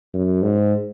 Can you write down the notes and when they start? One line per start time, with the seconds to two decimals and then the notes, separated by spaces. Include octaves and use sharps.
0.14 F#2
0.42 G#2